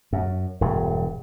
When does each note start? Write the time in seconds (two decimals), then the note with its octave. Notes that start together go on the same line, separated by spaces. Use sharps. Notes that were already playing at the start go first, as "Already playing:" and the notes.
0.13 F#2
0.61 E1 G2